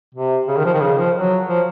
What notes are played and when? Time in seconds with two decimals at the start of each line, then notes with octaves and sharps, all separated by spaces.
0.15 C3
0.48 C#3
0.57 D#3
0.65 F3
0.74 D#3
0.81 C#3
0.98 F3
1.15 F#3
1.48 F3